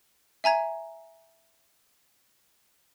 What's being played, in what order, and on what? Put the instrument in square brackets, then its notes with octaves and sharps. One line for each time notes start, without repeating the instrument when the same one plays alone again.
[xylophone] E5 G#5 A#5 G#6